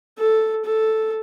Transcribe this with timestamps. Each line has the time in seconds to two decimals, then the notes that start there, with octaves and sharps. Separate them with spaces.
0.18 A4
0.65 A4